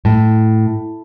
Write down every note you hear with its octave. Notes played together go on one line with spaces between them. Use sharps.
A2